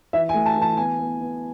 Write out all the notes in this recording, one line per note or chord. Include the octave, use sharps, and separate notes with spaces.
E3 E5
G#5
A3
A5
E3
A5
B3 G#5
B3
B3